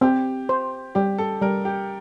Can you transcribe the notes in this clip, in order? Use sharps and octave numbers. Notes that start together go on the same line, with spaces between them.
C4 G4
C5
G3 G4
A4
G3 A#4
G4